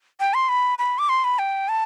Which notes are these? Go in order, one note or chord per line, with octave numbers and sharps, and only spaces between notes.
G5
C6
B5
B5
D6
C6
B5
G5
A5